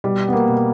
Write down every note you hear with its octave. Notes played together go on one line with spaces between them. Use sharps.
B2 G3
B3
A#3
B2